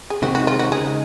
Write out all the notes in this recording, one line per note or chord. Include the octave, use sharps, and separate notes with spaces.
G#4
C3 D#3 G#3 C4 F#4
F#4
F4
F#4
C#3 G#3 D#4 G#4